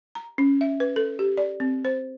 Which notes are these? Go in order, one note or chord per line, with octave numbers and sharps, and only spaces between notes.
A#5
C#4
E5
B4
A4
G4
D5
C4
C5